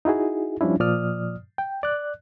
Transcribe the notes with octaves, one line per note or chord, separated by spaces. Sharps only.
D#4 E4 F#4 G#4
F3 G3 C#4 D4 E4
A#2 F3 D5 D#6 F6
G5
D5 F#6